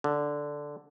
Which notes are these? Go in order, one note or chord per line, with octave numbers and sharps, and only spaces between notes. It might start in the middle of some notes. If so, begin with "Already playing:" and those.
D3